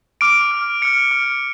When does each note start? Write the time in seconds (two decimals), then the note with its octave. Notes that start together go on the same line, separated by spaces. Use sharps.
0.21 D6 F6 D7
0.51 D6 F6
0.82 D6 F6 C#7
1.11 D6 F6